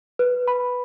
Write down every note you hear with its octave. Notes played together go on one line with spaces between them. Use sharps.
B4
B5